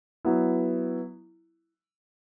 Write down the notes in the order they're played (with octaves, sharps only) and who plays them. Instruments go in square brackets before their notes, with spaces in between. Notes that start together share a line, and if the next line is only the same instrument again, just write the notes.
[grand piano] F#3 B3 E4